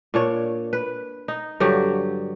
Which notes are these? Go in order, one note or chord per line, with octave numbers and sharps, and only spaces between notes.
A#2 D4 C#5
B4
D#4
G2 D3 F#3 G4